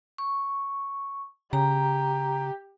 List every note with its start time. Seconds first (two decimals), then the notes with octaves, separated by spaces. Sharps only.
0.18 C#6
1.53 C#3 G4 A#5